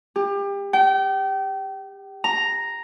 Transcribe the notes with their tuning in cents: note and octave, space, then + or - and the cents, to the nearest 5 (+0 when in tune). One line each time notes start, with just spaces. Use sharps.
G4 +30
G5 -30
A#5 +0